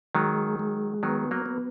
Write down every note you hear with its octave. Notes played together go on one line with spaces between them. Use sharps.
D#3 F#3 G#3
G#3
D#3 F#3 B3
F#3 A#3
B3